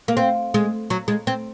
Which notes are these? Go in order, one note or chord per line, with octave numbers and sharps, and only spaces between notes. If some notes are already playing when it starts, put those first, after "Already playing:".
A#3
C4
G#3
F#3
G#3
C4